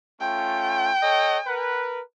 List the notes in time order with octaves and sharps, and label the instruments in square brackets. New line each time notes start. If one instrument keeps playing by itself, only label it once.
[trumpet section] A3 C#4 F4 [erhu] G5
[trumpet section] A4 C#5 D#5
A#4 B4